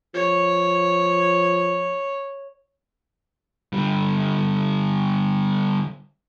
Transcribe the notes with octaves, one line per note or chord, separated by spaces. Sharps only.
F3 C#5
D3 G3